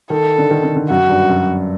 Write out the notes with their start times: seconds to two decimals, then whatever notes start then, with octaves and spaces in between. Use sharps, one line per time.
0.10 D#3 A4
0.38 D3
0.51 D#3
0.64 D3
0.76 D3
0.90 F#2 F#4
1.09 G2
1.29 F#2